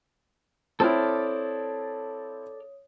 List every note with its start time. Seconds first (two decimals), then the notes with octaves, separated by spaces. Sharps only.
0.80 C4 E4 A4 C#5 D5 D#6 F6